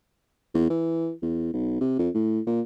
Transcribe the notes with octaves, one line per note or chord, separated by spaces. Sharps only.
E2
E3
E2
B1
C3
F2
A2
A#2